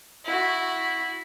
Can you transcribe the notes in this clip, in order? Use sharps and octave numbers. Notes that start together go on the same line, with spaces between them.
E4 F#4